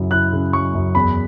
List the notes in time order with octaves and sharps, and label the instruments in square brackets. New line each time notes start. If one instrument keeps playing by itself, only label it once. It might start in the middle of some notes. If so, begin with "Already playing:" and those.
Already playing: [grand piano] F#2 C#3 F#3 E4
E4 F#6
C#3
F#3 C#6
F#2
E2 B5